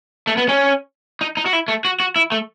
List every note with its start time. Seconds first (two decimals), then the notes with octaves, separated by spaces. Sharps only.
0.27 A3
0.37 B3
0.49 C#4
1.21 D#4
1.37 D#4
1.46 F#4
1.53 E4
1.68 A3
1.85 F#4
2.00 F#4
2.16 E4
2.32 A3